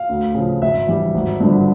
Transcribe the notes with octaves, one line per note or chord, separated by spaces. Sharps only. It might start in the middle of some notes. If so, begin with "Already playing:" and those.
Already playing: F5
D2
C#3 F3
G#1 E5
G2 E3 G3
G#1
G2 D3 F3